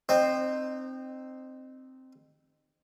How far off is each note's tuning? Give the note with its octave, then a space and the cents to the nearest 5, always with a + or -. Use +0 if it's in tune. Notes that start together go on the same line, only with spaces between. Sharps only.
C4 +0 D#4 -30 C5 +0